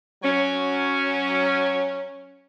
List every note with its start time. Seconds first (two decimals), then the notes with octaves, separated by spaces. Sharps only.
0.22 F#3 C#4